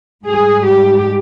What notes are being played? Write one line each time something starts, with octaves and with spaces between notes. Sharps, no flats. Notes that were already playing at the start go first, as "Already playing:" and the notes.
G#2 G3 G#4
G4